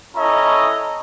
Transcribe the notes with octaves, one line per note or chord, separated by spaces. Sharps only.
C#4 E4 A4 C#5 D#5 A#5